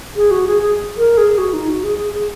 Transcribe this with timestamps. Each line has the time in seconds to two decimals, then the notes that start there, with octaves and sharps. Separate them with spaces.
0.16 G#4
0.31 F#4
0.47 G#4
0.62 G#4
0.97 A#4
1.17 G#4
1.38 F#4
1.53 D#4
1.68 F#4
1.84 G#4
1.99 G#4
2.14 G#4